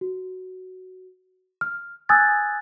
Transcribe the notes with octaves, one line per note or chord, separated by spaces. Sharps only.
F#4
F6
G#5 D#6 E6 F#6 G#6 A6